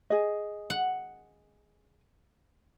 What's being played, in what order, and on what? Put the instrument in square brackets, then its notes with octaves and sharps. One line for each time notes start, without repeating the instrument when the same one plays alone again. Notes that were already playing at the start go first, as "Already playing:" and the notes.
[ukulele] G#4 D#5
[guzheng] F#5